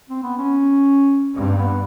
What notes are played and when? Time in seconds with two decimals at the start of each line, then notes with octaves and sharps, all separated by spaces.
0.09 C4
0.23 B3
0.38 C#4
1.37 G2 C4
1.52 A#3
1.58 B3